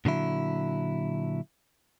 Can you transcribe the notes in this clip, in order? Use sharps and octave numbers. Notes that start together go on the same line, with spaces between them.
A#2 D3 F#3 E4